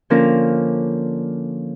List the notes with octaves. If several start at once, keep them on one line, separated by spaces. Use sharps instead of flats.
D3 F3 A#3 C#4 F4 A#4